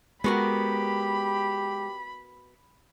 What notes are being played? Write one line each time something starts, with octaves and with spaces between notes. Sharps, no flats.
G#3 B3 F#4 G4 A#4 B5